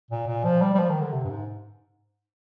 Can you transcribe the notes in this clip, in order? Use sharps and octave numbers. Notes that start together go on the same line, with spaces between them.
A#2
A#2
F3
G3
G3
F3
D#3
D3
C3
G2
G#2